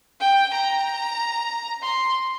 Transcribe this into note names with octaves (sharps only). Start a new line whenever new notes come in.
G5
A#5
C6